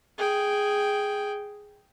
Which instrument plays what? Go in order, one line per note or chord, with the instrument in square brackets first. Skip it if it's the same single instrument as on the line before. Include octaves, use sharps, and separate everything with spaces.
[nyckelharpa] G#4 G5